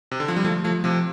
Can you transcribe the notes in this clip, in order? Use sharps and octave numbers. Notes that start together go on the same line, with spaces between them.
C3
D3
F3
G3
F3 A3
F3 A3
C3 F3